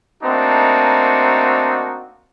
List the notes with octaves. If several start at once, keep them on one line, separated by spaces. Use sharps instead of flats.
A3 A#3 C4 D4 D#4 F#4